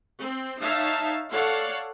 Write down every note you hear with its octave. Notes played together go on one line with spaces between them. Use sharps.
C4
D#4 C#5 E5 F5 A5
A4 C#5 D5 F5 F#5